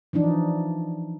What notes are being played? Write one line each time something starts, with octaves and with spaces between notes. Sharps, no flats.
E3 F3 D4 D#4